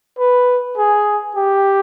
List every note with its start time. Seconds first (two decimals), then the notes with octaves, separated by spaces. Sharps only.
0.19 B4
0.78 G#4
1.37 G4